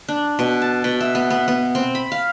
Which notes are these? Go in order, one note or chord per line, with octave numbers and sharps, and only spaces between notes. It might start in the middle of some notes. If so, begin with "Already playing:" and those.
D4
B2
A5
B2
E5
B3
B3
B3
C4
B5
F5